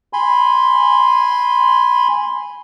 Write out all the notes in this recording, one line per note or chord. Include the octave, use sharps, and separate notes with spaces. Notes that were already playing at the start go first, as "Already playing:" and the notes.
G#5 B5 C6